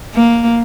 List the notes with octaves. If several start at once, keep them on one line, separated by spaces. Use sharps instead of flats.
A#3